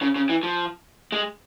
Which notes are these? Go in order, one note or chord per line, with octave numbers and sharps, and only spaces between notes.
C#3
C#3
E3
F3
G#3